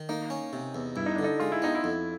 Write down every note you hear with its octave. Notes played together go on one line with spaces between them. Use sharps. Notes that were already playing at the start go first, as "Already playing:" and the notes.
Already playing: D#3
A#3 D#4
C#4
C3
E2
G2 E4
D#4
D3 D4
D#4
G#3 F4
E4
B3 D#4
E4
F2